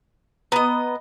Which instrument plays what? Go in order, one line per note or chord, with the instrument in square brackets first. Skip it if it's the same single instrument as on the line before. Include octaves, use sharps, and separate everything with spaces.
[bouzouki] B3 D#5 [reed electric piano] A#5